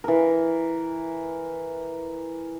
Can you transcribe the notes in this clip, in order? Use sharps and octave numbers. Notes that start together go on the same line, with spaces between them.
E3 A#4